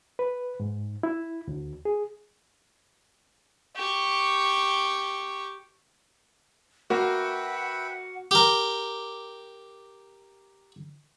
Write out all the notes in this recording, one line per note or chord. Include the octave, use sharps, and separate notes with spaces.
B4
G#2
E4
D2
G#4
G4 C#6
A#3 F#4 B4 E5 F#5 G5
G4 A#4